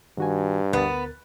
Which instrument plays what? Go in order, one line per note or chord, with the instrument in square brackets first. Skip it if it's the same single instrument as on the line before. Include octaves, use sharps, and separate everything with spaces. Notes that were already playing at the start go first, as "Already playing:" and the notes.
[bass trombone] G2 [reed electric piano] D#3 F#4 G#5
[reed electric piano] D2 A#4 A6 [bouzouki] B3